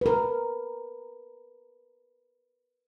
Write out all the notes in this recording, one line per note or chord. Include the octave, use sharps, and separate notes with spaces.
A#4 B4